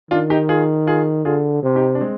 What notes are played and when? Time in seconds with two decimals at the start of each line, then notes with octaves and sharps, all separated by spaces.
0.11 D#3 D4 F4
0.30 D#4 G4
0.49 F4 G#4
0.87 F4 G#4
1.25 D3 F4 G#4
1.63 C3
1.75 D#4 G4
1.95 D4
2.00 G#3 C4